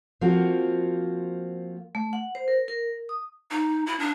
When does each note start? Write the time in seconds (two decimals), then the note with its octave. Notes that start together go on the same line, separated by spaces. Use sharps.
0.21 F3 A#3 C4 F4 F#4
1.95 A3
2.13 F#5
2.35 C5
2.48 A#4
2.68 A#4
3.09 D#6
3.51 D#4
3.86 E4
3.99 D4